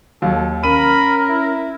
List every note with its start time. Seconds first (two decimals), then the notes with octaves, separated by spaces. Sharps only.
0.22 D#2 F#3 A4
0.64 C#4 A#4 B5 D#7
1.29 E4